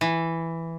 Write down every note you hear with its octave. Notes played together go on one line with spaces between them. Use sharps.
E3